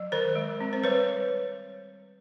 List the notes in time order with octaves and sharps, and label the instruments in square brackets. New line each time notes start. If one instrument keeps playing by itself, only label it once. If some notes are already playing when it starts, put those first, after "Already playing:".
Already playing: [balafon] F#3
D#3 A#4 C5
G#3
C4
C5
G3 B4 C#5